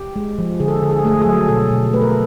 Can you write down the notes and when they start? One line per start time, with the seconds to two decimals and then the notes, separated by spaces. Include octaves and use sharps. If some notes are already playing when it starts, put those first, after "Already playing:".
Already playing: G4
0.16 G#3
0.38 F3
0.60 D3 G#4
0.68 A4
0.76 G#4
0.82 D3 A4
0.91 G#4
0.99 A4
1.05 A3 G#4
1.14 A4
1.22 F#3 G#4
1.48 B2 A4
1.72 B2
1.93 A3 B4
2.02 A#4
2.10 A4